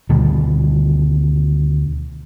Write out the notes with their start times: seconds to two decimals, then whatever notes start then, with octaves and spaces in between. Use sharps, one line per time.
0.09 D2 B2 D#3 G3